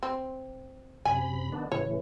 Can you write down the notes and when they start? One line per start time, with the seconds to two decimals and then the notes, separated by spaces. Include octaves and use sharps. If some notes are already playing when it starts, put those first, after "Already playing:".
0.03 C4
1.05 F#2 C3 G#5 B5
1.52 D#3 B3 D4
1.72 A2 C#3 E3 C#5